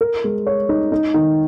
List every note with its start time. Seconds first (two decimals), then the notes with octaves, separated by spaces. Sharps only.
0.01 A#4
0.24 G#3
0.47 C#5
0.69 D#4
0.92 D#4
1.14 D#3